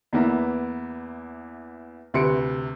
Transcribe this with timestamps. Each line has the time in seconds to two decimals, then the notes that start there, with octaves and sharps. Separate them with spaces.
0.13 E2 A#3 B3 E4 A#5
2.14 D2 C3 B4 C6 C#7 D7